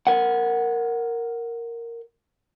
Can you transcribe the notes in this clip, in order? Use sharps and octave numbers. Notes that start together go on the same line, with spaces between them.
A#4 C5 F#5